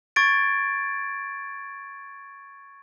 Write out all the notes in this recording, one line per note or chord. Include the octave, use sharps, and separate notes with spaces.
C#6 G#6 A6 D7